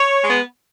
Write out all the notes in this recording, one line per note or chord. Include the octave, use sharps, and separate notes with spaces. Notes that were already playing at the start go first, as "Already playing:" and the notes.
Already playing: C#5
G#3 B3